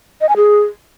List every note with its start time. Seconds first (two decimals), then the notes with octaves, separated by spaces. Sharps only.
0.21 D#5
0.29 G#5
0.37 G#4